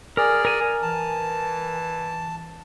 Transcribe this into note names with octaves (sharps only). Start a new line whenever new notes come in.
G#4 A#4 D5
A#4 G#5
E3 A5